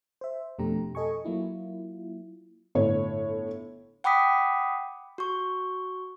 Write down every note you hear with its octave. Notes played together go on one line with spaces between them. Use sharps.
C5 E5
F2 B2 A3 D4 G4 A#5
A4 D#5 G#5 C#6
F#3 A#3 E4 F4
G1 A2 C#5
F#5 G5 B5 D6 D#6 B6
F#4 C#6